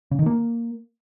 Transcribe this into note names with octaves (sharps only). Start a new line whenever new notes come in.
C#3
D#3
A#3